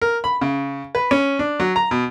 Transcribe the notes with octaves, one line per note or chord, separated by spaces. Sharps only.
A#4
B5
C#3
B4
C#4
D4
F#3
A#5
B2